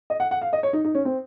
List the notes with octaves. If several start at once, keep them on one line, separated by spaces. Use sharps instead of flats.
D#5
F#5
F#5
F5
D#5
C#5
D#4
D#4
C#4
C4